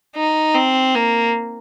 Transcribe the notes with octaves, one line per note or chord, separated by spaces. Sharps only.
D#4
C4
A#3